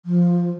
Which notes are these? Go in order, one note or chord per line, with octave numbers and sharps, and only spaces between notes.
F3